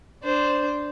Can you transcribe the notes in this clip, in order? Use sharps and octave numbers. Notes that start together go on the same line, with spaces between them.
D4 C5